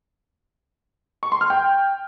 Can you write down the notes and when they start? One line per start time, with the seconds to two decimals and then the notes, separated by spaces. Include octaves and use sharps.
1.23 C#6
1.32 C6
1.41 F6
1.50 G5